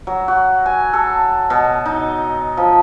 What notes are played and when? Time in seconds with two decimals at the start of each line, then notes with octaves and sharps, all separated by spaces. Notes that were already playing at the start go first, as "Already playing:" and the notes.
0.07 F#3
0.28 F#4
0.66 G#5
0.93 A4
1.50 B2
1.86 D#4
2.57 F3